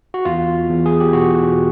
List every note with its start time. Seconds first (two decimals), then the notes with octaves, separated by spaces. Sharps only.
0.14 F#4
0.25 E2 F4
0.70 E2
0.86 G#4
1.00 G4
1.13 B2 F#4